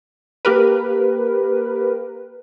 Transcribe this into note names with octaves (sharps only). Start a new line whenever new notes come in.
A#3 G4 A#4 B4